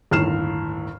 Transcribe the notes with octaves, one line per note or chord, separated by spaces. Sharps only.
G1 D#2 A2 F6 C7 E7